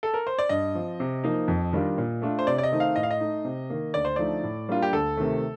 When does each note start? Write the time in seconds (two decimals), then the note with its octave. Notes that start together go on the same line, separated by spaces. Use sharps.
0.03 A4
0.14 A#4
0.27 C5
0.39 D5
0.49 G2 D#5
0.75 F3 C4
1.00 C3
1.24 F3 A#3 D#4
1.48 F2
1.73 D#3 G3 D4 F4
1.98 A#2
2.22 A3 D4 F4
2.39 C5
2.47 C3 D5
2.58 D5
2.63 D#5
2.72 D#3 A3 C4 D#4
2.80 F5
2.96 A2 D#5
3.03 F5
3.11 D#5
3.20 A3 D#4
3.45 C3
3.70 D#3 A#3
3.94 D2 D5
4.05 C5
4.16 D3 F3 A3 D#4 D5
4.43 A2
4.69 G3 A#3 D4 F4
4.82 G4
4.92 D2 A4
5.17 C3 D#3 A3